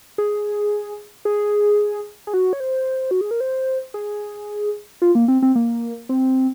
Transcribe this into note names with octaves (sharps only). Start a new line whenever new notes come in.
G#4
G#4
G#4
F#4
C#5
C5
F#4
G#4
A#4
C5
G#4
F4
A#3
C4
C4
A#3
C4